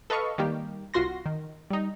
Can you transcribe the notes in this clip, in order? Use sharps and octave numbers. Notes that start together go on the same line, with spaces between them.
A4 B4 D#5 F5 C#6
D#3 G3 A#3 G4
C2 F4 F#4 C6 A#6
D#3
G3 D#4